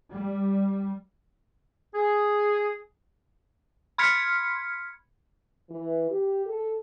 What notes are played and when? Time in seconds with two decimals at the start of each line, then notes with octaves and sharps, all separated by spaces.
0.12 G3
1.95 G#4
3.98 B5 C6 F6 G#6 B6 C#7
5.70 E3
6.10 G4
6.46 A4